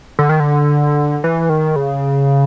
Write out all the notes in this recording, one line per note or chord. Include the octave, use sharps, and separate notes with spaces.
D3
D#3
D3
E3
D#3
C#3